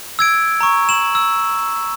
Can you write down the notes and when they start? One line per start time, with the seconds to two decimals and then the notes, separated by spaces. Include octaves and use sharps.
0.19 E6 G#6 D7
0.61 A#5 C#6
0.89 E7 F#7
1.15 E6